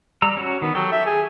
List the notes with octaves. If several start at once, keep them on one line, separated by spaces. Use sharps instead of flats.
G3 A#5 E6
C#4 F#4
D#3 B3
F#3 G4 A4 G5
E5
G#4